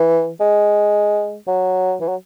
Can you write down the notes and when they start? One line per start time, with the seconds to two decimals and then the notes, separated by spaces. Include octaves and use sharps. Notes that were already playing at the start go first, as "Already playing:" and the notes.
Already playing: E3
0.40 G#3
1.47 F#3
2.00 E3
2.08 F#3